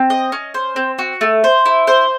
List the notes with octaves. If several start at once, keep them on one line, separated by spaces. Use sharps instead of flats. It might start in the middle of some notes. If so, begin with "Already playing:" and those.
Already playing: C4
D#5
C#4
C5
C4
F#4
A3
C5
E4
C5